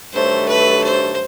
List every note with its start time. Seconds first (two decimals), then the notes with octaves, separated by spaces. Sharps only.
0.13 G2 D#3 F#3 A3 C5
0.49 B4
0.84 C5